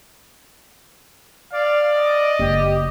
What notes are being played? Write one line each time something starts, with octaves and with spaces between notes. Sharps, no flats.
D5 F5
D#5
F#1 G4